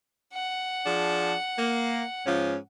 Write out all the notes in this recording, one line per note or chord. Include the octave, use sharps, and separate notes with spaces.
F#5
F3 D4 G#4
A#3
G#2 F3 C#4